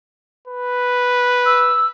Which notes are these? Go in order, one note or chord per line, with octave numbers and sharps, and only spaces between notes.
B4
E6